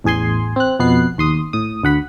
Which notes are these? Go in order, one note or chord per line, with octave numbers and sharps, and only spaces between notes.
A1 E2 G#4 G#5 C6
C4 F#6
F2 B2 B3 F#6 C7
D#2 C6 D#6
A2 D#6
D2 F#5 B5